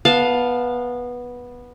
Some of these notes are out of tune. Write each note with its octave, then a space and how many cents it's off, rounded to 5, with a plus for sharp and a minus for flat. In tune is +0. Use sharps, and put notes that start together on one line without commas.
B3 -10 F5 +10 A5 +0